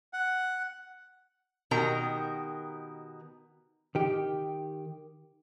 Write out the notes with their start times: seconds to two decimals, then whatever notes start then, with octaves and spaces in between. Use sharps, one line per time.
0.13 F#5
1.71 B2 D#3 G4 A#4 A#5
3.95 D#3 G4